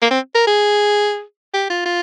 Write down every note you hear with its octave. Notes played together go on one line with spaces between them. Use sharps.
A#3
C4
A#4
G#4
G4
F4
F4